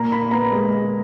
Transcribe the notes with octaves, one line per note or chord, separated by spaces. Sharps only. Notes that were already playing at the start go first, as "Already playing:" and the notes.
Already playing: A#2 A#5
A#2 B5
B3 A#5
G#3